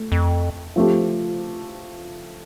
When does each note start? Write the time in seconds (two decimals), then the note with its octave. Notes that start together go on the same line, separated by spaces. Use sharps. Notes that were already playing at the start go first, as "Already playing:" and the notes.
Already playing: A3
0.12 F2
0.76 F3 A3 C4 G4